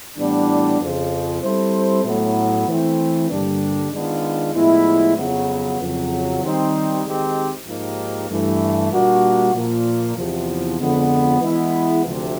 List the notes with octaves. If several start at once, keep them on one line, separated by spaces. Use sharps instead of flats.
A2 E3 G3 B3 D4
F2 C#3 F3
G3 C4 E4 A4 C5
A2 F#3 B3
E3 A3 C4
G2 D3 G3 A#3 D4
D#3 G#3 B3 D4 F4
A2 F3 G#3 B3 E4
F2 C#3 F#3 B3
F2 C#3 F#3
D#3 G3 C4 D#4
D#3 G#3 C4 D#4 G4
G#2 F3 A#3 D#4 G4
G2 E3 A3
A#2 G3 A#3 D4 F#4
A#2 F3 A#3
E2 C3 F3
F2 D3 F3 G#3 B3
E3 G#3 B3 E4
D2 C3 F3